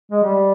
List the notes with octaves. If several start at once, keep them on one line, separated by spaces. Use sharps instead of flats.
G#3
G3